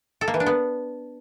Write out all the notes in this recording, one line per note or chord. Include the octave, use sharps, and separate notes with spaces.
A4
A#3
E3
D4
B3